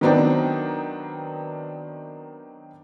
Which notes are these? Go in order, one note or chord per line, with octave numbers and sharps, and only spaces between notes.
D#3 F#3 B3 C4 D4 D#4